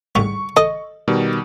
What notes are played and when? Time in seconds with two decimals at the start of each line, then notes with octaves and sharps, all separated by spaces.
0.15 C2 G#2 D3 C#6
0.56 A4 D#5
1.08 B2 D#3 G3